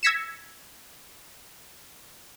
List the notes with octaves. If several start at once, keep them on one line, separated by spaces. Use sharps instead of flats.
E6 G#6 A#6 B6 C#7 E7